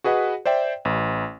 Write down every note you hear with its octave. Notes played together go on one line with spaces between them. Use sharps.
F#4 G#4 B4 D#5 F#5
C5 D5 E5 G5
A1